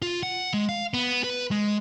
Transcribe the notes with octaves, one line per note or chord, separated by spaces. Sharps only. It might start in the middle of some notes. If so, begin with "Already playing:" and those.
F4
F#5
G#3
F5
B3
B4
G#3